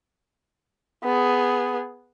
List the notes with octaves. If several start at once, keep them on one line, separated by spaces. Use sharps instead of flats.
B3 G#4